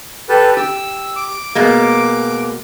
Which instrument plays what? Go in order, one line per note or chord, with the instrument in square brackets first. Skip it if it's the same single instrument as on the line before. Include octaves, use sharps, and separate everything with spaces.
[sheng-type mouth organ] G4 A4 B4
[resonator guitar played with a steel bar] G4 [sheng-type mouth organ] E6
[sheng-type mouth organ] D6
[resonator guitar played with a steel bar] B2 G#3 A#3